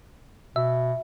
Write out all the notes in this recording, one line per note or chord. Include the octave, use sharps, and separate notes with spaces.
B2 E5